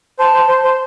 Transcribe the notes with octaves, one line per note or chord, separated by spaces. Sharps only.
C5 A5
C5
C5
C5